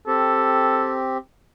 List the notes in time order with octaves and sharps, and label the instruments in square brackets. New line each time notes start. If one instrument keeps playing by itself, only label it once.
[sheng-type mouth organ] C4 G4 [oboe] A4